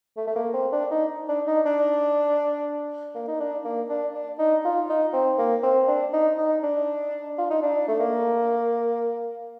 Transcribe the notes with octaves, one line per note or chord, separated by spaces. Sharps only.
A3
A3
A#3
C4
D4
D#4
D4
D#4
D4
A#3
D#4
D4
A#3
D4
D4
D#4
F4
D#4
C4
A#3
C4
D4
D#4
D#4
D4
F4
D#4
D4
A3
A#3